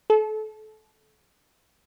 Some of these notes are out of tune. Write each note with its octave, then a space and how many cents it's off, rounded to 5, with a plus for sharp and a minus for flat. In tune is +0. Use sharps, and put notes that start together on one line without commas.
A4 -30